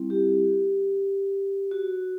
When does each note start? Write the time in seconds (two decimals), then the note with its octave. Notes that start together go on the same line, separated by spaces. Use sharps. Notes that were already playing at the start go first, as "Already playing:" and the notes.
Already playing: G3 C4 E4
0.10 G4
1.71 F#4